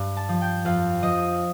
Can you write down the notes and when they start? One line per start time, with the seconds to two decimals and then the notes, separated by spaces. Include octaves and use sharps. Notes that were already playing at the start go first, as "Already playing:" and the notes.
Already playing: G2
0.17 A5
0.29 F3
0.41 G5
0.65 F2 F5
1.02 F3 D#5